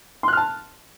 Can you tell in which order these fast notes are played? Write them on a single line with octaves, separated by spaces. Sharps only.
C6 F#6 F6 A5